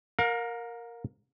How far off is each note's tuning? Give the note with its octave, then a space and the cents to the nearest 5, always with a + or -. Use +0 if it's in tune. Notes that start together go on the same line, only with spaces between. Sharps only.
A#4 +0 F5 +40